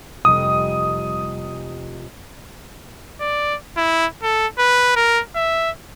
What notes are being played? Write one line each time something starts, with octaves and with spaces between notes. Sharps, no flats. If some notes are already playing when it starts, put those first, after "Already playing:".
F1 G3 D#5 D#6
D5
E4
A4
B4
A#4
E5